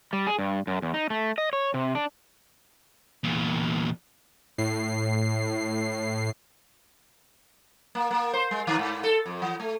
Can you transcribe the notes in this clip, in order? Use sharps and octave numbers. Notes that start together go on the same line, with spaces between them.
G3
G#4
G2
F#2
E2
D#4
A3
D#5
C#5
C3
D4
E2 A#2
A2 C7
A#3
A#3
C5
G#3
D#3
G#2
A4
F2
E3
A3